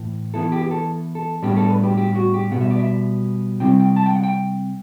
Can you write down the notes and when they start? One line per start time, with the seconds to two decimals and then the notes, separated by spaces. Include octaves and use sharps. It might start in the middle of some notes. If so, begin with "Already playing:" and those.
Already playing: A2 E3
0.34 E3 B3 E4 A4
0.52 G4
0.62 G4
0.71 A4
1.15 A4
1.42 A2 G3 B3 D4 G4
1.57 A4
1.70 B4
1.83 G4
1.97 G4
2.15 F#4
2.34 G4
2.51 B2 G3 B3 F#5
2.61 E5
2.71 D5
2.79 E5
3.60 C3 G3 C4 E4 G5
3.79 G5
3.96 A5
4.06 G5
4.16 F#5
4.24 G5